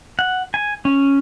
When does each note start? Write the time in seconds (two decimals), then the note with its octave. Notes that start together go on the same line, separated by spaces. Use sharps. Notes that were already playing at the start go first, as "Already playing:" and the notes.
0.19 F#5
0.54 G#5
0.85 C#4